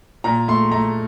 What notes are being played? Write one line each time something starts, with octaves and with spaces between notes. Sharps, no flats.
A#2 A#5
A3 C6
A3 A#5